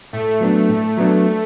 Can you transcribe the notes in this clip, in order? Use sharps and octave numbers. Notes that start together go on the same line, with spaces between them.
A2 A3
F#3 B3 D4
A2
F#3 B3 D4